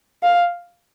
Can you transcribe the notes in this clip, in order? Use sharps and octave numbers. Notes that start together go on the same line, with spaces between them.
F5